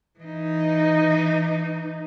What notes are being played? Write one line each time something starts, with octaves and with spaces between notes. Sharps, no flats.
E3 D#4